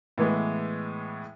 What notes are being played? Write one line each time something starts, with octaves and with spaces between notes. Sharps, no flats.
A2 E3 G#3 B3